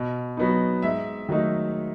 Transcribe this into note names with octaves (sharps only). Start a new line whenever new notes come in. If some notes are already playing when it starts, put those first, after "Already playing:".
Already playing: B2
F#3 B3 D#4
G#2 E5
D#3 F#3 A3 D#4